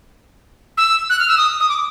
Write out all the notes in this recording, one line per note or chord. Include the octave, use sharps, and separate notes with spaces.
E6
F#6
F6
E6
D#6
D#6
D6